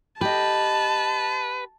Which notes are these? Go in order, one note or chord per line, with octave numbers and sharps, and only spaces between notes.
G4 B4 D#5 A5